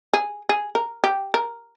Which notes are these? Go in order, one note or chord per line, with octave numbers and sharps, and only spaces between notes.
G#4
G#4
A#4
G4
A#4